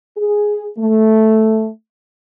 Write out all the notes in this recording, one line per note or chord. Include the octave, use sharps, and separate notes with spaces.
G#4
A3